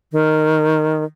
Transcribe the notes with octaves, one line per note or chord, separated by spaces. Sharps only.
D#3